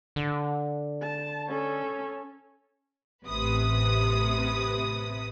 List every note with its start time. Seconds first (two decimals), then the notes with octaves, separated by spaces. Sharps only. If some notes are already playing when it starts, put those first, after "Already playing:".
0.16 D3
1.02 A5
1.48 C#4 A4
3.25 A1 C3 B4 D#6